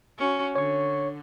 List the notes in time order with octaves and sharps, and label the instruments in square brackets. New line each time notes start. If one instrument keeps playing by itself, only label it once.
[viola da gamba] C#4 F#4
[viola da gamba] D3 [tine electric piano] C#5 C#6